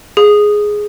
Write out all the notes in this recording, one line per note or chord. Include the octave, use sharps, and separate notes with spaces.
G#4